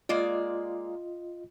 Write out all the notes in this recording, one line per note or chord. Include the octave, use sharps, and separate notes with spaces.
G#3 A#3 F4 D5 D#5